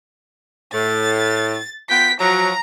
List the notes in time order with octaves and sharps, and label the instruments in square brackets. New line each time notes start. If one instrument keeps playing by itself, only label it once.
[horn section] A2 [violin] A6
[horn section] B3 F4 G5 [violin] B6
[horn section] F3 F#3 [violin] A#5